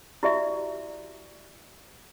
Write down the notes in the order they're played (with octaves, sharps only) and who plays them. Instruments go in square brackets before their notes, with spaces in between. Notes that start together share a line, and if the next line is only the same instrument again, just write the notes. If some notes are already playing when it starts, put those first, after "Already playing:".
[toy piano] E4 F#4 G4 D5 E5